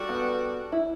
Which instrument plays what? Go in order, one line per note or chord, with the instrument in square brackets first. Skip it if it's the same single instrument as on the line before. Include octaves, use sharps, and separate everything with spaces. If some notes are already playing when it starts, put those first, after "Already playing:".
Already playing: [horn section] G3 D4 F#4 A4
[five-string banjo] B3
E4